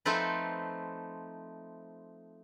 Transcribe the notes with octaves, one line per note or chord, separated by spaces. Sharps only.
F3 A3 C4 D#4 A4 B4